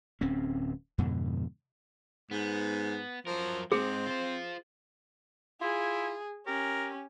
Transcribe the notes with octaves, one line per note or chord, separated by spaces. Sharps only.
D1 C4 C#4
F2 G#2 B2 D3
G#2 B3
F3 F#3 A#4
G#2 G#3 C4 G#4
F4 C5
E4 F4 G#4
C#4 G4 A#4